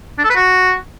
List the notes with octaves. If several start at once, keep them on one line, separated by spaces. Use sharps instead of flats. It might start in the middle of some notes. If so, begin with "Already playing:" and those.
D4
A4
B4
F#4